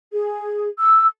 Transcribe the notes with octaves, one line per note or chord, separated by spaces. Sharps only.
G#4
E6